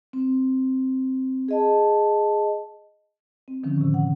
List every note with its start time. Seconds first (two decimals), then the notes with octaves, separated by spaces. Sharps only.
0.13 C4
1.48 G#4 D#5 A5
3.48 C4
3.63 D3 D#3 F3 C#4
3.78 A2 C3
3.94 F#5